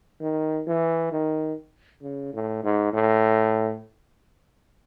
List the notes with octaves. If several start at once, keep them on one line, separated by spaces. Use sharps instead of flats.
D#3
E3
D#3
C#3
A2
G#2
A2